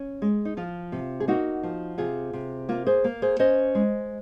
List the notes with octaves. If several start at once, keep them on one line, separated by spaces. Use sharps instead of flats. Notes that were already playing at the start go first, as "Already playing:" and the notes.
Already playing: C#4
G#3
D#4
F3 F4
C3
G#4
A#3 D#4 F#4
F3
C3 F4 G#4
C3
A#3 F4
G#4 C5
A#3
G#4 C5
C#4 C5 D#5
G#3